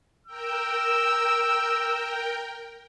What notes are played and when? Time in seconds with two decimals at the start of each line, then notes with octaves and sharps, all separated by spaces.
0.27 A#4 G5 E6